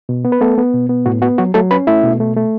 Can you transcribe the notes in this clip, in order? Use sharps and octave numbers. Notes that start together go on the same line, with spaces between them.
B2
B3
B4
A3 B3 A4
B3
B2
B3
A2 F#4
B3 F#4
F#3 F#4
F#3 A3 A4
C#4 B4 B5
A3 E4 E5
B2
A3
A3